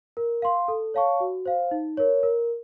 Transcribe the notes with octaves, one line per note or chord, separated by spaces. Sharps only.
A#4
F5 C6
A4
C#5 F5 A5 C#6
F#4
C5 F5
D#4
A#4 C#5
A#4